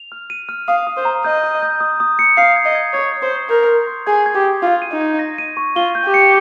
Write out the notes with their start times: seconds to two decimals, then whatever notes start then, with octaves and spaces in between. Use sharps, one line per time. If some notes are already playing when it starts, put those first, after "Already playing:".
Already playing: F7
0.12 F6
0.30 D#7
0.49 F6
0.68 F5 D#6
0.87 D#6
0.96 C5
1.05 A#5
1.24 D#5 G6
1.43 D#6
1.62 G6
1.80 D#6
2.00 D#6
2.19 C#7
2.37 F5 C7
2.56 G#6
2.65 D#5
2.75 G#6
2.93 C#5 G#6
3.12 G#6
3.22 C5
3.31 C#6
3.50 A#4 G6
3.69 C6
3.87 C6
4.06 G#4 G#6
4.26 G#6
4.35 G4
4.44 D#6
4.62 F4 G#6
4.82 D#7
4.92 D#4
5.00 G#6
5.19 A#6
5.38 D#7
5.57 C#6
5.76 F4 G7
5.95 G6
6.05 G4
6.14 C#7